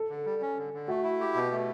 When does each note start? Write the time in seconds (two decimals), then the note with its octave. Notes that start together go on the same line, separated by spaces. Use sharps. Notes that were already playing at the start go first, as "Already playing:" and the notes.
Already playing: A4
0.09 D3
0.25 G3
0.42 C#4
0.58 D3
0.73 D3
0.88 A3 F#4
1.04 E4
1.21 G4
1.35 B2
1.51 A3